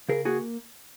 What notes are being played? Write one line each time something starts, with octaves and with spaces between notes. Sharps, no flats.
C#3 G#4 A#4
A#3 F#4 G#4